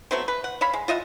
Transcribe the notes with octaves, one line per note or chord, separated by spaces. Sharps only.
F#3 A3 B3 C4
B4
F#5
C#5 E5 F5 B5
G#3
F4 D#5 E5 F#5